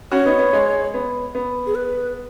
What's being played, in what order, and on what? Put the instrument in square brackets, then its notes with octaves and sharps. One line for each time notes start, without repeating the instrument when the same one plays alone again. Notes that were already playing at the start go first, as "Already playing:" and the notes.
[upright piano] C#4 F#4 [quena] C#5
[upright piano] B3 D#4
B3
G#3
B3
B3
[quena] G#4
B4